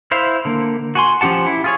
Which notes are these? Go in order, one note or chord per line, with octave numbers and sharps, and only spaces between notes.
E4 C5 E5 F5
D3 A#3
F#4 G#5 C6
F3 C#4 G4 F#5 A5
E4
F4 G#4 C#5